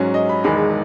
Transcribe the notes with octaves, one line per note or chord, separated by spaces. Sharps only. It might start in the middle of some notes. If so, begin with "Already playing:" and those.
Already playing: G#2 F#3 C#4
D#5
B5
E1 E2 D#3 G#3 B5